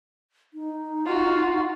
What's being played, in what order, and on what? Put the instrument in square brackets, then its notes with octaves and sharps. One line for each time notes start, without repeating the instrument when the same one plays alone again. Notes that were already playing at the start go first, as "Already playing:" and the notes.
[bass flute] D#4
[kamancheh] F4 F#4